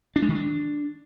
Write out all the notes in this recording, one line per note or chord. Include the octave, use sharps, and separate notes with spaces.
D4
G#3
D#3
D4